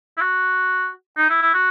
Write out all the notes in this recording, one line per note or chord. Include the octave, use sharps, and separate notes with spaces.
E4
F#4
D#4
E4
E4
F#4